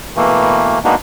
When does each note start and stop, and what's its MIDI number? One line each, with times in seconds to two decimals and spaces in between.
0.17 0.79 47
0.17 0.79 52
0.17 0.79 57
0.17 0.79 58
0.84 0.95 56
0.84 0.95 58
0.84 0.95 59
0.84 0.95 62
0.84 0.95 63
0.84 0.95 66